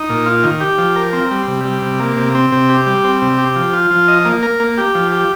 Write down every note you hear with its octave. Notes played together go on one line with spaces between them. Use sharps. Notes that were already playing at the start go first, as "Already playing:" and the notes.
Already playing: D#4
A#2
F4
D#3
G4
F3
A#4
C4
G3
C3
G3
C3
A#3
C3
C4
C3
G4
G3
C4
C3
G4
F3
F4
F3
D#5
A#3
A#4
A#3
G4
F3
G4